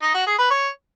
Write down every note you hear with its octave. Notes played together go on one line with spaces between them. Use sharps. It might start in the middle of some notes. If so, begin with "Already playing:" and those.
D#4
F#4
G#4
B4
C#5